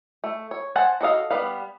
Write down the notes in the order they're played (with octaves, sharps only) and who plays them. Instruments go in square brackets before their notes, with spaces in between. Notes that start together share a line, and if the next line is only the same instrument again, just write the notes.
[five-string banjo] A3
C#5
C5 F#5 G#5 A5
F#4 A4 D#5 F5
G3 B3 B4 F5